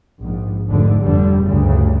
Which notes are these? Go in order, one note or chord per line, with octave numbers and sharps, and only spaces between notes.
A#1 G#2
F1 F2 G#2 D3
F1 G2 D3 G3
D2 G2 C#3